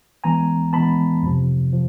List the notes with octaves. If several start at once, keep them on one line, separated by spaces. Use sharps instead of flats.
E3 G#3 B3 G#5 A#5
E3 G#3 B3 A5 B5
F2 C3 F3
F3